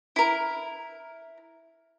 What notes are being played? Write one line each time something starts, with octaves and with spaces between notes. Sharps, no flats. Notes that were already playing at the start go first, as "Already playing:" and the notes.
E4 A#4